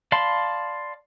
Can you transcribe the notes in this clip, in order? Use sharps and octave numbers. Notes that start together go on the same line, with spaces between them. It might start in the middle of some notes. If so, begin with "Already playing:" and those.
D5 F5 A5 B5 C6